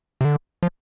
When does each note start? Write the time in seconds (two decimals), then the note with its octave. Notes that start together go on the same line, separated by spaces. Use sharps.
0.21 C3
0.25 D3
0.63 F3